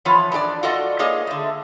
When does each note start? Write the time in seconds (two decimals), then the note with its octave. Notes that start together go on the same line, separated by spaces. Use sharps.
0.05 E3 F3 B3 F4 C#5
0.32 G#2 D4 G4 D5
0.63 F4 F#4 A4 D5 D#5 F#5
0.99 G#3 A#3 G#4 C#5 D#5 F5
1.27 D3 A3